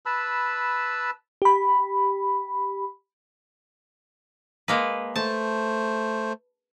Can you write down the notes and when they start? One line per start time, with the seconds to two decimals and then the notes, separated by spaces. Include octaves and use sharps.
0.06 B4 A5 B5 E6
1.42 G4 B5
4.68 G#3 A#3 B4
5.16 A3 C5 A5